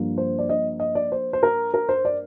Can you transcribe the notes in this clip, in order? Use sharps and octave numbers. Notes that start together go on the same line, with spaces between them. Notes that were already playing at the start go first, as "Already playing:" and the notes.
Already playing: G2 F3 A#3
C5
D5
D#5
D#5
D5
C5
C5
A#4
A#4
C5
D5